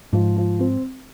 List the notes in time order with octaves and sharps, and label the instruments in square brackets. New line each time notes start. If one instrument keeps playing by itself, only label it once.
[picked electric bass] G#2 [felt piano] F3
[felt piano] F3
C4